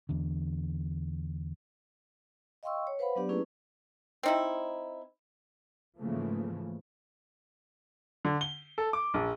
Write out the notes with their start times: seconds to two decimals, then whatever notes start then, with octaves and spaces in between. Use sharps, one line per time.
0.09 E2 D3
2.63 D#5 F5 G5 C6 C#6 E6
2.87 C#5
2.99 B4 C5 F5 F#5 B5
3.15 F#3 B3 D4 G4 D5
3.29 A3 A#3 C#4 E4 G#4 B4
4.23 C4 D#4 E4
5.98 G#2 C#3 E3 F3 A3 A#3
8.25 D3
8.41 G7
8.78 A4
8.93 D6
9.14 A#1